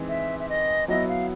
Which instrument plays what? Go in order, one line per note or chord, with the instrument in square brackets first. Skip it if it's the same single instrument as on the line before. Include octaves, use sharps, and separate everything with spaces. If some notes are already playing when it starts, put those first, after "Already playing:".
Already playing: [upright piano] E3 G#3 C4 D#4
[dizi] E5
E5
D#5
[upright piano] F#3 B3 E4 [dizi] D#5
[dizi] F5